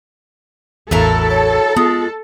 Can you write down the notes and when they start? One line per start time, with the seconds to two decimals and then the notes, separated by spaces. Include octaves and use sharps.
0.91 A1 E2 F#3 E4 A4 A#4
1.30 C#5
1.77 G#3 B3 F4